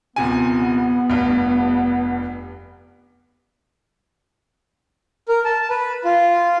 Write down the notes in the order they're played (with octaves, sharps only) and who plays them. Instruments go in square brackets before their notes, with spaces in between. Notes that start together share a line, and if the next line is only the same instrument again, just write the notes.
[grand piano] D#1 C3 G#5 [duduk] B3
[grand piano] F1 G2
[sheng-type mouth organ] A#4
A5
B4
F4